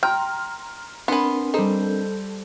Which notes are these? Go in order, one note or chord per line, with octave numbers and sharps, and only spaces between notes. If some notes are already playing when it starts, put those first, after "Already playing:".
G5 A#5 C6 F6
B3 C4 D4 A#4 B4 G#5 C6
G3 D#4 A4 C5